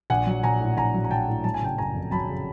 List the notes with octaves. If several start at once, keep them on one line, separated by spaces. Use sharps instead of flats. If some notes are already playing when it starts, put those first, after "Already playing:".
A#1 F#5 G#5
F#3
A#1 G#5 A#5
A2
A#1 G#5 A#5
F#3
A#5
A#1 G5 A5
A2
F#3 A5
G#5
C#3 G5 A5
F#1 G#5 A#5
F2
F#3 A5 B5
C#3